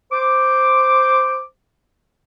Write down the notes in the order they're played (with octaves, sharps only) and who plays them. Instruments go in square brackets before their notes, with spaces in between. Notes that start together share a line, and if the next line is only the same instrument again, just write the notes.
[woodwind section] C5 D6